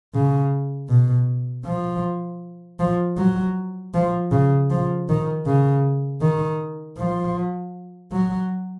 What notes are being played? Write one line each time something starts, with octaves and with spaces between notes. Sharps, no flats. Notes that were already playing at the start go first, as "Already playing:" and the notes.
C#3
B2
F3
F3
F#3
F3
C#3
F3
D#3
C#3
D#3
F3
F#3